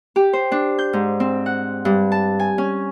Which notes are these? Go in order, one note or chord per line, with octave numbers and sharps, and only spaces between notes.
G4
C5
D4
G6
G#2
C4
F#5
G2
A5
G#5
C#4